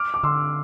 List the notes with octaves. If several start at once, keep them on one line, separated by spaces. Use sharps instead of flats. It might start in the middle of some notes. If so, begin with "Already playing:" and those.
Already playing: D6 F6
D6
D3 C6 E6